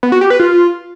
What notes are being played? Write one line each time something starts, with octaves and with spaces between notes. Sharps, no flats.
B3
F#4
G4
B4
F4